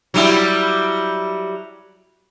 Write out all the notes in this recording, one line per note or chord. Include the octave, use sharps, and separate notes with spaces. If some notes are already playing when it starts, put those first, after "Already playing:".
F#3 G3 E4